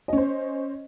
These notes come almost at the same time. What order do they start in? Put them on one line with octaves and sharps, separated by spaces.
D#5 C#4 C5